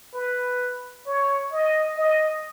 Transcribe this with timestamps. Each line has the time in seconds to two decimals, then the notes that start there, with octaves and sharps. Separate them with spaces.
0.14 B4
1.06 C#5
1.53 D#5
1.98 D#5